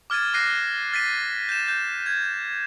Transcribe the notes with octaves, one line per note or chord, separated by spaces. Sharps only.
D6 F6 G#6 A6 D#7
D6 F6 F#6 A#6 C7 D#7
F6 A6 B6 D#7
G6 E7
G6
G#6